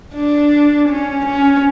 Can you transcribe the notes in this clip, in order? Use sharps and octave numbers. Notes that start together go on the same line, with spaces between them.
D4
C#4
C#4